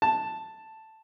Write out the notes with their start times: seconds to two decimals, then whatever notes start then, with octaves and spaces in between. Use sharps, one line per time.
0.02 A5